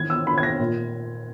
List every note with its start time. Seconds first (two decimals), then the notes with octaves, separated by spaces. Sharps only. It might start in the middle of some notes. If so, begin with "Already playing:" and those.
Already playing: D#3 E3 G#6
0.10 E6
0.27 D#3 B5
0.38 G#6
0.43 A#6
0.59 A#2